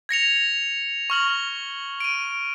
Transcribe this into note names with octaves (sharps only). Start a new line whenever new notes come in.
G#6 A#6 C#7 F7
C#6 F6 F#7
D7 D#7